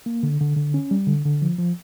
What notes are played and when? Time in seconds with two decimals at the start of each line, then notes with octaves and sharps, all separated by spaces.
0.06 A#3
0.23 D3
0.41 D3
0.56 D3
0.74 C#4
0.91 G3
1.07 D3
1.25 D3
1.42 F3
1.59 F3